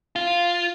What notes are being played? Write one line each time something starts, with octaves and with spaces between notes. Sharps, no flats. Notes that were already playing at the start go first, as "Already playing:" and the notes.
F4